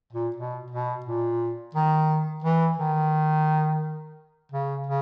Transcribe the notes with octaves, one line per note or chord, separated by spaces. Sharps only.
A#2
B2
B2
A#2
D#3
E3
D#3
C#3
C#3